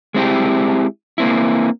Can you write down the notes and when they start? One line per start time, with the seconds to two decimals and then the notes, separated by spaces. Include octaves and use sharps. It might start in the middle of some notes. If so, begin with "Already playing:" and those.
0.14 G#3 C4 E4 G4
1.18 A#3 C4 E4